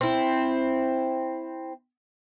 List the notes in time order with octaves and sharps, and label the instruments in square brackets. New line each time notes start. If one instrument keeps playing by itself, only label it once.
[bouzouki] C4 E4